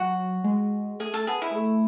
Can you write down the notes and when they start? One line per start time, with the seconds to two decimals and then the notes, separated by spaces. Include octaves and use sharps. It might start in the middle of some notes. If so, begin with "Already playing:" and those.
Already playing: F#3 F#4
0.44 G#3
1.00 A3 G#4
1.14 A4
1.27 B3 G#4
1.42 E4
1.50 G#3
1.55 A3